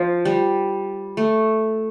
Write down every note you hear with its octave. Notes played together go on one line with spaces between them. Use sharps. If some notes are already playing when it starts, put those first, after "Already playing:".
Already playing: F3
G3
A3